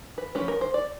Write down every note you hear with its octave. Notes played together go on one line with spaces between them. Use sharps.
B4
F3 A3 C#4 B4
A#4
C5
D5